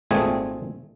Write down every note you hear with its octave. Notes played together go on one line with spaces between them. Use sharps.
G#1 A#2 A3 C4 G#4 G#5